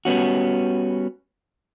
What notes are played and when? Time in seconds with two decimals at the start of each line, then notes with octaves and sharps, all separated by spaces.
0.05 G3 B3 C#4 F#4